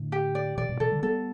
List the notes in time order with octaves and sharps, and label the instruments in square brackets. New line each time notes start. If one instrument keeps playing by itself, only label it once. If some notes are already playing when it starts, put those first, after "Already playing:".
Already playing: [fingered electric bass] A2 D3
[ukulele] G4
D5
[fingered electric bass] B2 E3 [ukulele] D5
[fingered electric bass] G2 B2
[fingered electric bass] B2 E3 [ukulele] A4
[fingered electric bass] D3 G3
[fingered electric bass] G3 B3 [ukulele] A4